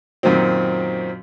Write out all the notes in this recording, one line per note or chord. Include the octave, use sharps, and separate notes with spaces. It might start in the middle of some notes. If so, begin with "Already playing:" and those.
F#2 A#2 D#3 F#3 C4